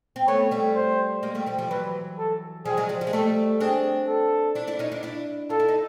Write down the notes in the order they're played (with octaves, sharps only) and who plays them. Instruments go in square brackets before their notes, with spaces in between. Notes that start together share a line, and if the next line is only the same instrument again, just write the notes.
[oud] C4
[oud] A3 B3 [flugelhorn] C#5
[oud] G3 A3
[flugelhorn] C5
[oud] G#3 A#3
G3 A3
F3 G3
F3 G3
[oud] E3 F#3 [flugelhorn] B4
[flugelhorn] A4
[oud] F3 G3 [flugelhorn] G#4
[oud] F#3 G#3
F3 G3
F3 G3
G#3
[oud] G3 A3 [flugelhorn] A4
[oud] C4 D4 [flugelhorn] G#4
[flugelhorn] A4
[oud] D4 E4
D4 E4
C#4 D#4
D4 E4
D4 E4
[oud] F4 [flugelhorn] A4
[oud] E4
D#4